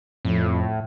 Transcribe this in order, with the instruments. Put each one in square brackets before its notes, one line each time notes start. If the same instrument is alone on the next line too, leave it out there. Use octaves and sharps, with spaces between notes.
[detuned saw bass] F2 [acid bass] A2